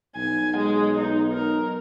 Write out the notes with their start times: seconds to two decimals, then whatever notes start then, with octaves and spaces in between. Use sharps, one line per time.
0.16 B1 G#5
0.57 G#3
0.98 D#4
1.32 A#4